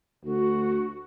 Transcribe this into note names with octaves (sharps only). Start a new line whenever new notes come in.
D2 F#4